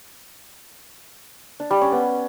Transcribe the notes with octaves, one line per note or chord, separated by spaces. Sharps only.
D4
G3
C#4
B3